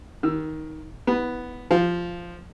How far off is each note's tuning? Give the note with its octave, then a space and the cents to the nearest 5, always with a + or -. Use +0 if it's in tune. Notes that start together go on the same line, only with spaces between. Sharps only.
D#3 +10 E6 +15
B3 +0 E4 -35
F3 -5 F5 +0